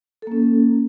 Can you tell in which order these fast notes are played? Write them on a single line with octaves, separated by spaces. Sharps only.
A4 A#3 C#4